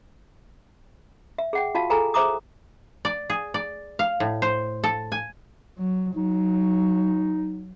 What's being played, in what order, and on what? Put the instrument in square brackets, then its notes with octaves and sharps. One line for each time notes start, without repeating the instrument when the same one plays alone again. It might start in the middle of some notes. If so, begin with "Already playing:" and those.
[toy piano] E5
G#4 F#5 G5
F4 F#4 F5 A5
G#4 A4 G#5 A#5
G#4 C5 E5 A#5 D6 D#6
[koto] D5
G#4
D5
F5
A2
C5
A4
G#5
[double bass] F#3
[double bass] F#3 [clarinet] D#4